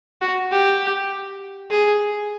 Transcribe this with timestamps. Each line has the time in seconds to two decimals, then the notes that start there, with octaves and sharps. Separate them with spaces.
0.21 F#4
0.52 G4
1.71 G#4